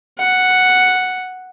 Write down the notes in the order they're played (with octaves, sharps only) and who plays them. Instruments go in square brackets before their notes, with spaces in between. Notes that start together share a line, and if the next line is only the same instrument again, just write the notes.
[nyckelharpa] F#5